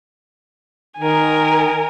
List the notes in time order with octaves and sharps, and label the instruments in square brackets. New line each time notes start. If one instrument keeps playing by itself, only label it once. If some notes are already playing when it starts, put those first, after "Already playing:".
[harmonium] D#3 [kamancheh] A#4 G#5